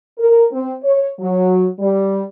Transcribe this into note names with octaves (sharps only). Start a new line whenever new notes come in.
A#4
C4
C#5
F#3
G3